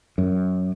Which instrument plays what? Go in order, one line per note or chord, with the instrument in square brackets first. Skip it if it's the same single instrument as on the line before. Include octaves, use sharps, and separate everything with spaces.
[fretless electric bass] F#2